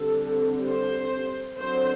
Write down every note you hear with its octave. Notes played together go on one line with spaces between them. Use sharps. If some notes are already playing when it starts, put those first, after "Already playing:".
Already playing: D3 G3 C4 A4
C5
D3 F#3 C4 C5